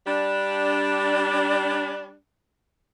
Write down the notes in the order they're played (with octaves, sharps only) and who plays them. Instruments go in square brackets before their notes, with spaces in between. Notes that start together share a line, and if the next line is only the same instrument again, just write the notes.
[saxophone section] G3 D4